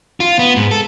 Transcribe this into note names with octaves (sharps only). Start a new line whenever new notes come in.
F4
B3
G#2
A4